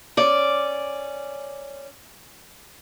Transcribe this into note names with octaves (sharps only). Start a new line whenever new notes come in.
C#4 D5